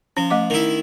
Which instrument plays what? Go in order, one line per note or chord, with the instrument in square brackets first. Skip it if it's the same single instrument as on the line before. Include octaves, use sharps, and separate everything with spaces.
[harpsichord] F3 [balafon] C#4
[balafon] A3 D#5 D6
[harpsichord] D#3 E4